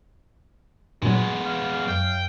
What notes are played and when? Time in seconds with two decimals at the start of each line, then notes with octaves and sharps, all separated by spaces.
1.02 G2 A#2 F#3 G#3 B3
1.46 F5
1.88 F#2 G5